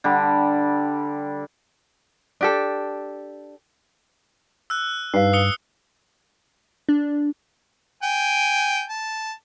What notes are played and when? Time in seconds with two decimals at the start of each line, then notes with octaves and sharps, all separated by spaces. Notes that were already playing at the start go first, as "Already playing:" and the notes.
0.04 D3 G3
2.41 D4 G4 A4
4.70 E6 F#6
5.14 G2 D#4 B4 F5 C7
5.33 D#6 C#7 G7
6.89 D4
8.03 G5 G#5
8.90 A5